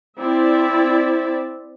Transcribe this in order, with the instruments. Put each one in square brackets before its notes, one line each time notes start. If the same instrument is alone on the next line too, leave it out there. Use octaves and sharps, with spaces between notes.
[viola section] C4 E4 D5 E5